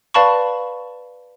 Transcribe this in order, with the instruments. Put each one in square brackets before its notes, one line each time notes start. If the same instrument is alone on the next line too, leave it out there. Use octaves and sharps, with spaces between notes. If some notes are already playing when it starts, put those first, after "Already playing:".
[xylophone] B4 D5 F5 A5 B5 C#6